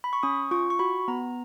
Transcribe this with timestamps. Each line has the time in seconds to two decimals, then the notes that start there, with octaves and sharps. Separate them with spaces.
0.04 B5
0.13 C#6
0.23 C#4 D#6
0.51 F4 C#6
0.70 C#6
0.79 F#4 B5
1.08 B3 A#5